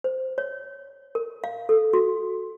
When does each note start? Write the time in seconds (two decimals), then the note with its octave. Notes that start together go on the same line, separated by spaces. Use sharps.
0.04 C5
0.38 C#5
1.15 A#4
1.44 F5
1.69 A4
1.93 F#4